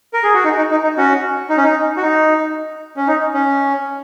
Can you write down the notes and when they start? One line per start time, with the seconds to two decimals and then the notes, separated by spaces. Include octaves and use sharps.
0.13 A#4
0.23 G#4
0.34 F#4
0.44 D#4
0.58 D#4
0.71 D#4
0.83 D#4
0.97 C#4 F#4
1.49 D#4
1.57 C#4
1.64 D#4
1.97 F#4
2.02 D#4
2.97 C#4
3.07 D#4
3.34 C#4